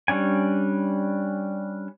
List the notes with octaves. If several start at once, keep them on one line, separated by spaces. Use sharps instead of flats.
G3 C#4 D4 G#5